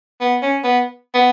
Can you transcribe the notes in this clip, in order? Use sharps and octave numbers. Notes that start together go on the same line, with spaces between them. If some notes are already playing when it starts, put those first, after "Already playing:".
B3
C#4
B3
B3